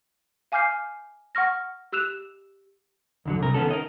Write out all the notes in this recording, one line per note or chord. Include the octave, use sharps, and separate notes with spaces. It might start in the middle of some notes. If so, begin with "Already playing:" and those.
F5 G#5 D6 F6 G6 C7
F#5 C#6 F6 A#6
G4 E6 F#6 E7 F7
D#2 D3 F#3
C2 A#4
D#3 B3 C#4 A4
A#4 D#5